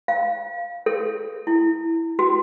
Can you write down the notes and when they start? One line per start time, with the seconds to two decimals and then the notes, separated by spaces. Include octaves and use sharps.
0.08 F5
0.86 A4
1.47 E4
2.19 F#4